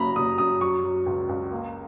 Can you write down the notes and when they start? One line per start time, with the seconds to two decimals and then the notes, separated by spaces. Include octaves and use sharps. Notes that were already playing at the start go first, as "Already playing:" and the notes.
Already playing: F#1 F#2 A#5 B5
0.16 F#1 D#6
0.38 F#2 D#6
0.61 F#3 C#6
0.84 F#3
1.06 C#2
1.29 C#2
1.51 A#3